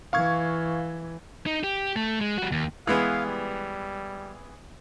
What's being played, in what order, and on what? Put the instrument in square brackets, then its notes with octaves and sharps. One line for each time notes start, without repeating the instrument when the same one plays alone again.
[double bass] E3 [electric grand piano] F5 C#6 G#6
[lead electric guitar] D#4
G4
A3
G#3
G3 F#4
D#2
[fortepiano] E3 G#3 B3 [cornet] F5
[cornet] G3